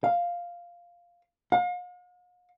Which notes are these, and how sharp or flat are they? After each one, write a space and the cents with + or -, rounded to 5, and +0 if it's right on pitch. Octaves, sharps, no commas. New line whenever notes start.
F5 +0
F5 +45